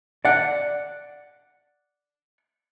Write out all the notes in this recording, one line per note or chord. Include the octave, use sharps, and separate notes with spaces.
D5 F#5